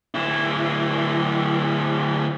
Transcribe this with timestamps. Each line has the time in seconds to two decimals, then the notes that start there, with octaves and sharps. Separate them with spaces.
0.14 D2 E4